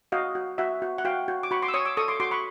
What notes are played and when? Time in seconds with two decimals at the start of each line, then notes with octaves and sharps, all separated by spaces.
0.12 F#4 D#5 F5
0.35 F#4
0.58 F#4 E5 F#5
0.82 F#4
0.98 F#5
1.05 F#4 F5 G5
1.28 F#4
1.43 D6
1.51 F#4 B5 C#6
1.62 C6 D6
1.68 E6
1.74 C#5 C#6 D#6
1.85 D6 E6
1.97 A4 C#6 D#6
2.08 C6 D6
2.20 F#4 C6 D6
2.31 B5 C#6